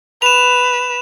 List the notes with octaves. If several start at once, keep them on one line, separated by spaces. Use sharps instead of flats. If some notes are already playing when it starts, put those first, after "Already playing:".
B4 E7 F7